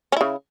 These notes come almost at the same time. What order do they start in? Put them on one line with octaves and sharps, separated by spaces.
C#4 E4 C#3